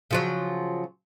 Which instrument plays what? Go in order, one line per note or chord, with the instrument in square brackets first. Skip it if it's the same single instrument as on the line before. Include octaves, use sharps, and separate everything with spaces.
[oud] C#3 F3 F#3